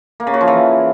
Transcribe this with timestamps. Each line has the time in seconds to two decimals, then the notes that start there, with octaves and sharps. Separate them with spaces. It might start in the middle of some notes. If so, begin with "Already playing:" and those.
0.20 A#3
0.27 C#3
0.34 F#4
0.41 F3
0.48 E3